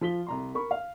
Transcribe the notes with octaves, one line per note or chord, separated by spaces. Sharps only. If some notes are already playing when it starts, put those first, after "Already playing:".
F3 F4 B6 G7
C2 A#5 C6
A#4 B5 C#6
F5